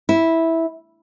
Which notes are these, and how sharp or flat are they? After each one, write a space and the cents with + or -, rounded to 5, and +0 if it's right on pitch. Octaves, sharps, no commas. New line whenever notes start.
E4 -10